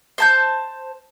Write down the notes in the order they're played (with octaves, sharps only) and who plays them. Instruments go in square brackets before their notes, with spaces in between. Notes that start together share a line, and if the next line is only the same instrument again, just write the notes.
[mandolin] C5 A5 G6